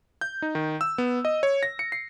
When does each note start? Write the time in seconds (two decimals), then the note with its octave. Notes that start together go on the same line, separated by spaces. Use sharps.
0.21 G6
0.42 D#4
0.55 D#3
0.81 E6
0.98 B3
1.25 D#5
1.43 C#5
1.63 A#6
1.79 C#7
1.92 C7